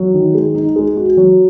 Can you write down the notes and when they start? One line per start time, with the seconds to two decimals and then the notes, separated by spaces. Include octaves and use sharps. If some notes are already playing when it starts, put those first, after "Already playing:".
Already playing: F#3
0.14 D#3
0.35 G#3
0.55 D#4
0.76 G#3
0.97 F#4
1.17 F#3